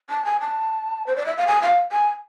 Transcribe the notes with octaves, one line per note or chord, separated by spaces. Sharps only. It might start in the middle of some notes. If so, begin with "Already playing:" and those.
A5
G#5
A5
C5
D5
E5
F5
G#5
F5
G#5